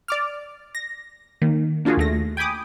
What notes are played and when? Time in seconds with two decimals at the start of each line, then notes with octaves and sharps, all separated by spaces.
0.08 D5 D6 F6
0.75 A#6
1.42 D#3 A#3
1.85 A#3 D4 F4 F#4 G#4
1.97 D#2 A3 A#6
2.37 G5 G#5 B5 D6 D#6